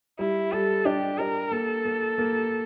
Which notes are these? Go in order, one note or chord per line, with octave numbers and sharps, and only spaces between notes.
G3 E4
G3 A4
D4 G4
D4 A#4
A#3 A4
A#3
A#3